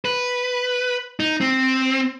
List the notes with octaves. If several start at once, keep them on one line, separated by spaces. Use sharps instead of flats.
B4
D#4
C4